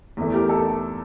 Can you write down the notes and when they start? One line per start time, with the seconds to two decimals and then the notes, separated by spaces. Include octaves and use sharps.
0.17 E2 E3 A3
0.33 G4 A#4
0.49 A4